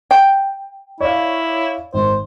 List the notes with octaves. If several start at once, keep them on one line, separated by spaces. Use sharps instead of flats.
G5
E4 C#5 D5 F5
G#1 C5